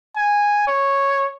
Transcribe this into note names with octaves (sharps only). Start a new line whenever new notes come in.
G#5
C#5